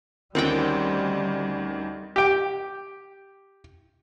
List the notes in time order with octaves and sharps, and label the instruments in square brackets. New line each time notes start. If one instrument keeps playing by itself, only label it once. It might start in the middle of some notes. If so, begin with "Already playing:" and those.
[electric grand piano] D2 D#3 [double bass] G3 [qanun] C4 F#5 G5 [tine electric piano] C#4 A#4
[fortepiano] G4 G5